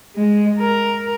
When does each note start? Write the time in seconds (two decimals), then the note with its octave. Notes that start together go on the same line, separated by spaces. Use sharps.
0.16 G#3
0.59 A#4